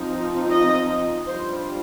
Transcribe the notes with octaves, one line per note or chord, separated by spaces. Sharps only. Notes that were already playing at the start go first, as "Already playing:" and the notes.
Already playing: F3 C4 D#4
D#5
G3 D4 F4 C5